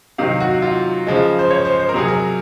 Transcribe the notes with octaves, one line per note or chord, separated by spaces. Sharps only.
C3 D#3 F#3 F5
F#4
F4
C#3 F3 G#3
C5
C#5
C5
C5
A#4
C3 F#3 G#4
A#4